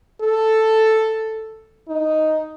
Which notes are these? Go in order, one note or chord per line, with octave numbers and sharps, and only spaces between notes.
A4
D#4